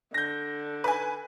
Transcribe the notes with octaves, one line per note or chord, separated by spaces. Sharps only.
D3 G6 A#6
B4 G#5